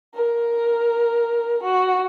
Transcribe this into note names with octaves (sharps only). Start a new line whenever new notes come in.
A#4
F#4